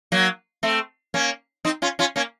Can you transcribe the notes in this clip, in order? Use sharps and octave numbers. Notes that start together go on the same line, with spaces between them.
F#3 A#3
A3 C4
A#3 C#4
C4 D#4
C#4 F4
C#4 F4
A#3 C#4